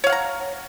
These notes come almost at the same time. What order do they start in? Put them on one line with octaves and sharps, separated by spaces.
C#5 F5 F#5 A#5